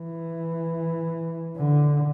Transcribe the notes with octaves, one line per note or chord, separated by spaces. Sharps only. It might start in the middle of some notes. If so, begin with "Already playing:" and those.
Already playing: E3
D3